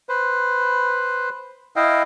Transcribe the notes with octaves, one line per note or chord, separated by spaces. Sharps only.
B4 C5
E4 D#5 F5 G5